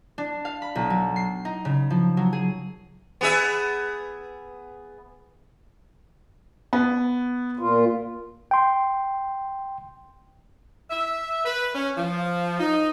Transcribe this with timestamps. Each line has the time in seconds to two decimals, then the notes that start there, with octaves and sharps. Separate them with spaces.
0.18 D4
0.45 F5
0.62 B5
0.75 B1
0.90 F#3
1.16 C7
1.45 D#4
1.65 C#3
1.90 F3
2.17 F#3
2.33 G#4
3.21 B3 G#4 E5
6.73 B3
7.59 A#2 F4
8.51 G5 C6
10.91 E5
11.45 B4
11.74 C#4
11.97 F3
12.59 D#4